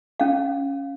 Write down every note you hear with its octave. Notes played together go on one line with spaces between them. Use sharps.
C#4 F5